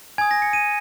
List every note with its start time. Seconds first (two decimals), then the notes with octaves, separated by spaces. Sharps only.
0.18 G#5 D#6 G#6
0.31 A#6
0.42 C#7
0.53 D#7